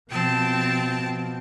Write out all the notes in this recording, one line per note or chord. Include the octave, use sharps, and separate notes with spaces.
B2 F3 C4 G5 A5